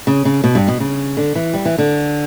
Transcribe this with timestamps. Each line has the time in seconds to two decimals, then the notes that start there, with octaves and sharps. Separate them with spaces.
0.07 C#3
0.25 C#3
0.44 B2
0.55 G2
0.68 B2
0.80 C#3
1.17 D3
1.35 E3
1.54 G3
1.65 E3
1.78 D3